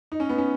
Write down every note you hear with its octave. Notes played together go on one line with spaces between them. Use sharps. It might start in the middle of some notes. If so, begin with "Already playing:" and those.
D#4
C#4
B3
C#4